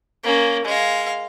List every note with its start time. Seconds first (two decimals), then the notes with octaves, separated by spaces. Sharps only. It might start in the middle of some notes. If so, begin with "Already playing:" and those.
0.24 A#3 C#4
0.65 G#3 F5